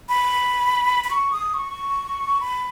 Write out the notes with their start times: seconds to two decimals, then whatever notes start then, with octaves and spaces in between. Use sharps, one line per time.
0.09 B5
1.04 B5
1.11 C#6
1.32 D#6
1.54 C#6
2.40 B5